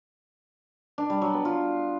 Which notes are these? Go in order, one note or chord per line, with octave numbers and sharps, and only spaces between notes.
D4
G3
F#3
B3
F4